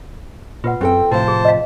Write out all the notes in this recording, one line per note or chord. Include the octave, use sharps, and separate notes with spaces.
A#2 F4 B4 F#5
F#2 C4 A4 G5
A2 C3 F3 C5 A5
G#4
D#5 F5